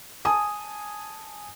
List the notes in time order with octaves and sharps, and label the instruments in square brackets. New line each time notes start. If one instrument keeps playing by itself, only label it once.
[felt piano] G#5 A5 D#6